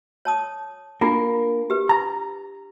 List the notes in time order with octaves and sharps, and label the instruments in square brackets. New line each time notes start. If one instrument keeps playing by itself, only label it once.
[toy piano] C#5 A5 D#6
[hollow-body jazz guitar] A#3 A#4 [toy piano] D4 F4
[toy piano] G4 B4
[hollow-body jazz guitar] A#5